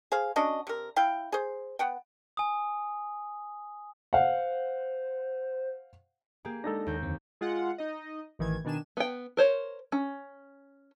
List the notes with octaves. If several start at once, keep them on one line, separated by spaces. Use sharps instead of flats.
G#4 C5 F5
C#4 D4 F#4 D#5
C3 A#4
E4 F5 G5
G#4 C5
B3 F#5 G5
G#5 D#6
C5 F5 F#5
A#3 G4 G#4
G#3 D4 D#4 A4 A#6
D#2 G6
F2 D3 C4
G#3 F4 F#5
D#4 D#5
A1 D#3 E3 G#6
B2 D#3 D4 G#5 E7
B3 G5
A#4 C5 C#5
C#4